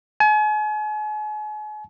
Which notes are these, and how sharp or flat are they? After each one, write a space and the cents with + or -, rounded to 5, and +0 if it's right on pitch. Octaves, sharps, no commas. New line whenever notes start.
G#5 +40